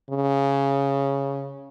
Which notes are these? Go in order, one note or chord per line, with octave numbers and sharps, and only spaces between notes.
C#3